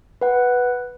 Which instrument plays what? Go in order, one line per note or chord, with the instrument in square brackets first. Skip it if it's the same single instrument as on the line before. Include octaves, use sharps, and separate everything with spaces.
[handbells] B4 F#5